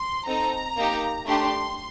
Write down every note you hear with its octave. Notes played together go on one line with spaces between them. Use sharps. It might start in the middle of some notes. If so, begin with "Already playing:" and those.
Already playing: C6
C4 D#4 A4 A#5
A#3 D#4 G4
A3 D4 G4 C6